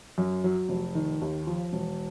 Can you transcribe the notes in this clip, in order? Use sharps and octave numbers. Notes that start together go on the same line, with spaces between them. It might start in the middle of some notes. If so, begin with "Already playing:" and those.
F#2
F#3
F1
D#3
D#2
F3
E1